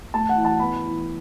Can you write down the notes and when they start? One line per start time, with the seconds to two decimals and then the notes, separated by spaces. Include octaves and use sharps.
0.14 A3 A5
0.29 F#5
0.36 E3
0.45 A5
0.59 B3 B5
0.83 E3